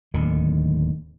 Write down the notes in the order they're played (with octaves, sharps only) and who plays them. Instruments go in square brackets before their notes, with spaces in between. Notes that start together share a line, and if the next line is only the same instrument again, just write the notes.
[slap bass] D1 D#2 D3 D#3